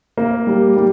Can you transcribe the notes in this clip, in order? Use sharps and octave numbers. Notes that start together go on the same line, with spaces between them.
A#3
G3
G3